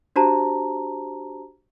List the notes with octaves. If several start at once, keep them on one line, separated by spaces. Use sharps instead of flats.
D4 F#4 G4 C5 A5 A#5